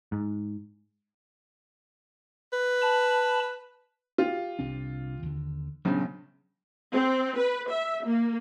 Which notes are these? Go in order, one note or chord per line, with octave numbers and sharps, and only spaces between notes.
G#2
B4
A5 B5
F4 G4
C2 C4 D4
D#2 D3
A#1 G2 C#3 F#3 B3
C4
B4
E5
A#3